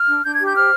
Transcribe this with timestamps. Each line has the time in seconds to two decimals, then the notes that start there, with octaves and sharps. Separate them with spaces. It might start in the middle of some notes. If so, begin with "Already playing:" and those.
Already playing: F6
0.08 D4
0.24 D4 G6
0.35 G4 G#6
0.45 G6
0.55 C5 F6